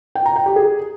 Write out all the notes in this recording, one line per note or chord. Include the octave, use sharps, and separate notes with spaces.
G5
A#5
G5
G4
G#4